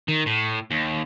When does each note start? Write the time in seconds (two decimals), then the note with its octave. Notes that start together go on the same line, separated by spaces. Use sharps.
0.08 D#3
0.26 A2
0.71 D#2